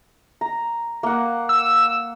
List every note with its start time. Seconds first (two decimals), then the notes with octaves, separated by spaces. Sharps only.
0.41 A#5
1.03 A#3 F#5
1.49 E6